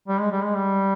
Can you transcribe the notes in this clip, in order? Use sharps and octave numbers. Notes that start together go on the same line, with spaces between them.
G3
G#3
G3
G#3
G3